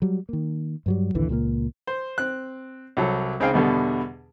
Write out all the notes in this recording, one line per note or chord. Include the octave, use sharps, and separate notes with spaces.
F#3 G3
D#3 A#3
G2 F#3 G3
A#1 D#2 D3 E3
C#2 A#2 F#3 A#3
C5
C4 F#6
C2 F#3 A4
C#2 C4 D#4 G#4 F5 G5
E2 B2 D3 G3